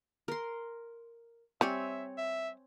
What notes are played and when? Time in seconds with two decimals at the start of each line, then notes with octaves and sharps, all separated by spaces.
0.28 A#4 C6
1.61 G3 C4 C#5 E5 G#5
2.18 E5